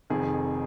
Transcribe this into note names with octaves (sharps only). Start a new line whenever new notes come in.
F1 F2 D#3 G#4